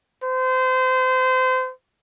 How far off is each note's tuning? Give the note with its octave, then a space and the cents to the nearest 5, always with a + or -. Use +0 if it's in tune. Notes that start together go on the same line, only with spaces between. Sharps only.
C5 -30